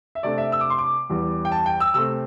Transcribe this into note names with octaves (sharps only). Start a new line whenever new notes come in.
E5
C3 A3 D4 D5
E5
E6
D6
C6
D6
E2 E3 G3
G5
A5
G5
E6
C3 A3 C4 E6